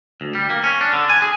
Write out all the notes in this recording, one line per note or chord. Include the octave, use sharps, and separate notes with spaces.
D2
G3
A#3
C#4
D4
D3
G#5
G#4